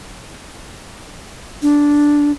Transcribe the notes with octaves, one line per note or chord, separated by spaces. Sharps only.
D4